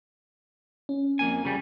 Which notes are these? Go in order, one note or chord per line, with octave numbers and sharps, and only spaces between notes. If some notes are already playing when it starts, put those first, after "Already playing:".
C#4
F2 A#3 G#5
F2 C#3 G3